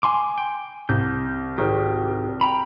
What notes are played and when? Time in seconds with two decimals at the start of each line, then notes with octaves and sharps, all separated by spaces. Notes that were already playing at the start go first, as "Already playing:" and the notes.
0.03 G#5 C6 D6
0.38 G5
0.89 C2 G6
1.58 G#1 D#3 G4
2.41 G5 A#5 B5